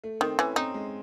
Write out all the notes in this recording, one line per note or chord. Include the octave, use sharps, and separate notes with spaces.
A3
D#3 C4
E3 C#4
C4 D#4
G#3